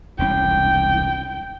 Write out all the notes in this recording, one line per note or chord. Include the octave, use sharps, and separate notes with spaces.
E1 C2 C#4 G5